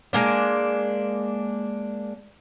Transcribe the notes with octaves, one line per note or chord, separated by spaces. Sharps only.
G#3 A#3 D4